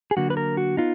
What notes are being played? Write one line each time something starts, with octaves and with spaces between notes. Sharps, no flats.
G#4
D3 F#3 A#3 F#4
B4
A#4
F#4
B3 D#4 F4